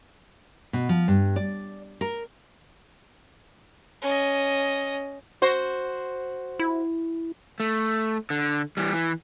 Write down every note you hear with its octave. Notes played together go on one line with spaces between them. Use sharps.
B2
F3
G2
D5
A#4
C#4 D#5
F#4 C5
E4
A3
D3
E3 G3
E3